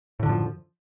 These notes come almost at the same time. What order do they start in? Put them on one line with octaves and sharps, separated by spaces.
A2 D3 F#2 F3